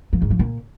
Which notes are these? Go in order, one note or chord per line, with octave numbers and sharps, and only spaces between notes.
F3
G#2
F3
A#2